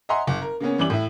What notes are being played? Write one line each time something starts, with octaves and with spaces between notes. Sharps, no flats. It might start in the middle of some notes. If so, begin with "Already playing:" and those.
D#5 E5 F#5 G#5 A#5 C6
F#1
A#4
C#3 A#3 B3 C#4
F#2 E3 G3 D6 F#7
A2 E4